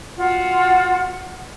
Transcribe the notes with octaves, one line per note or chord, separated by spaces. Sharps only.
F4 F#4 F#5